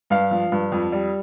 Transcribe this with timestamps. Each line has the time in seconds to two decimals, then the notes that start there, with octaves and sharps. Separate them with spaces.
0.10 G2 F5
0.31 F3
0.52 G2
0.72 F2
0.92 G3